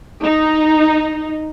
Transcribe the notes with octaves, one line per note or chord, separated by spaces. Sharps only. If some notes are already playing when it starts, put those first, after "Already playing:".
D#4